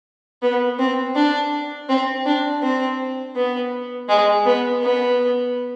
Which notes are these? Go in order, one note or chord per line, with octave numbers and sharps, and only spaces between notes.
B3
C4
D4
C4
D4
C4
B3
G#3
B3
B3